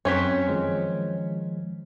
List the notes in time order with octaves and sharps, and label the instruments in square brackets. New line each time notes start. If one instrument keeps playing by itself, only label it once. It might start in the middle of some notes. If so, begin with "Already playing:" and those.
[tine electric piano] F#2 B6 [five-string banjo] F#3 C4 C#4
[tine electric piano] D#3 F3 G#3